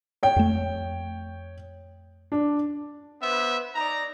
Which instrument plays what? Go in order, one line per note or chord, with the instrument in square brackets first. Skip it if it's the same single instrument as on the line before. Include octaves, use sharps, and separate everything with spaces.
[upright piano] C#5 G5
[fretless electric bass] F2 A3
[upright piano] D4
[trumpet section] B3 B4 C5 E5
D#4 D5 A#5